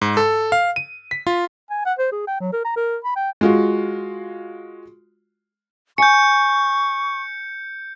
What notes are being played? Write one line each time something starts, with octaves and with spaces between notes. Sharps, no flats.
G#2
A4
F5
D#7
B6
F4
G#5
F#5
C5
G#4
G5
F#3
A#4
A#5
A#4
B5
G5
G#3 F4 F#4
G#5 C#6 G6 C#7